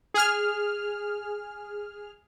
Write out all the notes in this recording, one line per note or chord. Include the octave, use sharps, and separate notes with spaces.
G#4 F6